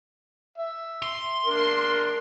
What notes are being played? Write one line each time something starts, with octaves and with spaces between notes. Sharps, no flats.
E5
C6
D4 A#4